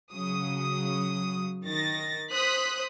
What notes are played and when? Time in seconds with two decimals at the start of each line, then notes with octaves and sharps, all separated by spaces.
0.12 C#3 F#3 D#6
1.65 D#3 A6 A#6
2.31 C5 D#6 F#6 B6